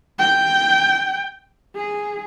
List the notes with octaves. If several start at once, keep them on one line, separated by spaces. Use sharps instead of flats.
G5
G#4